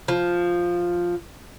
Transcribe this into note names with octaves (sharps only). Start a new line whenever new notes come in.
F3